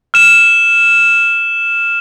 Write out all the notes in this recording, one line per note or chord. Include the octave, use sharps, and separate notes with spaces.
F6 E7